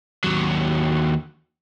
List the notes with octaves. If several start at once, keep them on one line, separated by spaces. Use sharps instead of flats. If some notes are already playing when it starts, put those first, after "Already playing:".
D#2 F#3